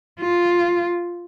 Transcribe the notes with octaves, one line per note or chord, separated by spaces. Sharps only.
F4